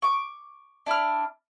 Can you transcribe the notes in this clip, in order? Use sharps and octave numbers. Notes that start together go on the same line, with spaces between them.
C#6 D6
D4 E4 B5 F6